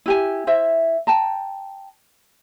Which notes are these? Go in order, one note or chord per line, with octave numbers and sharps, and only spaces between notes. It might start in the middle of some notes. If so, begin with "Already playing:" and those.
E4 G4 G#5
E4 C5 E5
G5 A5 A#5